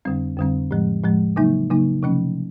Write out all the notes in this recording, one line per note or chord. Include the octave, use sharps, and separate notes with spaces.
F2 D3 G3 C4
F2 D3 G3 C4
A2 F3 G#3
A2 F3 G#3
C#3 F#3 A#3 D#4
C#3 F#3 A#3 D#4
C3 F3 A3 C#4